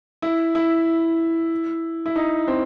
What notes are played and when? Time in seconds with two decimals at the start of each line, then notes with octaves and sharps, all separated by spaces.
0.22 E4
0.55 E4
2.06 E4
2.16 D#4
2.48 C4